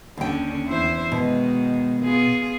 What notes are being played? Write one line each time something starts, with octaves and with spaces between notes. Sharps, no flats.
D#2 D3 C#4 G5
E2 E4 C5
B2 D#3 G#3
B3 F4 G#4